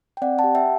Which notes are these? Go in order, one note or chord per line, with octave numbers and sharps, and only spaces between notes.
G5
C4 D5 F#5
F#5 A5
G4
E5 G5